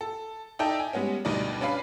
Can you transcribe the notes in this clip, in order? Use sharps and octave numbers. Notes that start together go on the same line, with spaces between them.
A4
D#4 A4 D5 E5 G5 A5
G#5
G3 G#3 B3 C#4
D2 G2 B2 D#4 D5
C#4 D4 B4 F5 B5